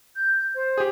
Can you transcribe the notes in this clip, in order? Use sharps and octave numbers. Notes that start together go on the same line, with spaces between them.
G6
C5
G4 G#4